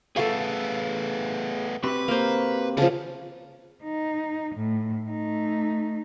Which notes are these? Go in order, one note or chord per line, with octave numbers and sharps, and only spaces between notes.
A3 B3 G#4 A4 F5 D6
C4 F#4 G4 B4
A#3 C5
C#3 E3 F3 A4
D#4
A2
A3 D#4